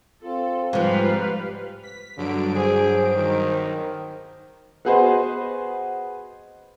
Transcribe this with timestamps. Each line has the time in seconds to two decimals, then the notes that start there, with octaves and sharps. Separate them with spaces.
0.23 C4 F4 A4
0.73 G#2 F3 G3 B4 F5
1.83 B6
2.17 G2 D3 F#3 D7
2.56 G#4 C5
3.15 D#3
4.85 B3 F#4 G#4 B4 C5 D#5